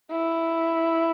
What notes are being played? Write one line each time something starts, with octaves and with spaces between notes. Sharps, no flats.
E4